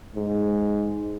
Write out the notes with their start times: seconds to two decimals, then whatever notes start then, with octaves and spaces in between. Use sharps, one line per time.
0.16 G#2